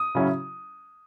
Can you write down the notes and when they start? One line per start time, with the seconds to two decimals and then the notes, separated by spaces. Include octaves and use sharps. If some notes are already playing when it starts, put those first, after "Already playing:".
Already playing: D#6
0.15 C#3 F#3 C#4 E4